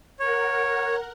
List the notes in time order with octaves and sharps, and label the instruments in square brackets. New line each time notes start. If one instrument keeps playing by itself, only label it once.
[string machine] A#4 F#5 [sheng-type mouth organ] C#5